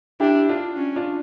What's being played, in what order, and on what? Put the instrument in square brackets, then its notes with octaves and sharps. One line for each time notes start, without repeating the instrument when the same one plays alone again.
[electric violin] D4 [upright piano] E4 G4
[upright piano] D4 F4
[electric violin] C#4
[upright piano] D4 F4